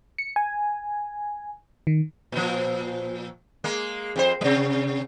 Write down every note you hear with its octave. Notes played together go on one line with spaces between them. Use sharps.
C#7
G#5
D#3
A#2 F3
G#3 A#3
F2 F#4 C5
C3 G3